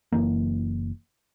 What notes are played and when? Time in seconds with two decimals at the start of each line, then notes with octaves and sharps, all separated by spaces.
0.12 F#1 E3 A#3